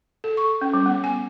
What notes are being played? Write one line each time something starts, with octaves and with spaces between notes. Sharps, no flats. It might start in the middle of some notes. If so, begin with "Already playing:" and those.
A4
C#6
C#4
G3
B3
G#5